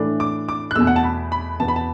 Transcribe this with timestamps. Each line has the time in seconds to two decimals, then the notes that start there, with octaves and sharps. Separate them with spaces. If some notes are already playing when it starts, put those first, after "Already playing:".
Already playing: A2 E3 A3 D4
0.20 D6
0.49 D6
0.71 F#6
0.76 E2 B2 A3 E6
0.87 F#5
0.96 A5
1.04 B5
1.32 B5
1.60 E2 B2 B3 A5
1.68 B5
1.76 A5